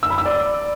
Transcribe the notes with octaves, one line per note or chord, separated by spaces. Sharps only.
E6
B5
E6
D5